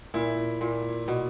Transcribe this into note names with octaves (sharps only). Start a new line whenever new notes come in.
A#2 E4
A#2
B2